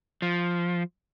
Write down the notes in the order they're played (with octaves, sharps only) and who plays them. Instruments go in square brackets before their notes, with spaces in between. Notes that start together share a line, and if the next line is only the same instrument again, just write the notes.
[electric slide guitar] F3